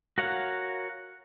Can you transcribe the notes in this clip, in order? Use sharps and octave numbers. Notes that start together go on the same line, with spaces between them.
F#4 A#4 C#5 F5 F#5